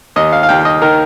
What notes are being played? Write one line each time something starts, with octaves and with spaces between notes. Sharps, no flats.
D#2 D#5
F5
F5
D#2 G5
D#5
D#3 A#4